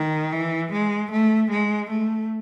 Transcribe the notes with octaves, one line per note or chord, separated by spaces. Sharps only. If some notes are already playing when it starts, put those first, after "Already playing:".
Already playing: D#3
E3
G#3
A3
G#3
A3